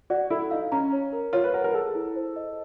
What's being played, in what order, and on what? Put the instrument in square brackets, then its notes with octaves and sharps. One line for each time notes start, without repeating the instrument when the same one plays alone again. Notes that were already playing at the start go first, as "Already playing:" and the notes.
[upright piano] F#4 [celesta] D5
[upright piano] E4 [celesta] A4
[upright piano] D#4 [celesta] F5
[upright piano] C#4 [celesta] A#5
[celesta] C#5
A#4
[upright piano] F4 [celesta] C#5
[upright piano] B4
[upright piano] A#4 [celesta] F#5
[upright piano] A#4
[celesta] G#4 [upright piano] A4
[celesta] E4
C5
D#5